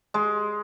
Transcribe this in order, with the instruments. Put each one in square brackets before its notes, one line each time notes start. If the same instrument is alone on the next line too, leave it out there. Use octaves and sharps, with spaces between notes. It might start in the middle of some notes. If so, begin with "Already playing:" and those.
[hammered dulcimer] G#3